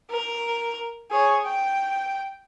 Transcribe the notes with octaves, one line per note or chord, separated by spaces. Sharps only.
A#4
G#4 C#5
G5